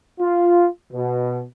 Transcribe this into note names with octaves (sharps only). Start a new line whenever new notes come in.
F4
B2